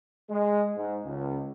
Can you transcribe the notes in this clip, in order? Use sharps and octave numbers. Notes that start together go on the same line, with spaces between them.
G#3
G#2
C#2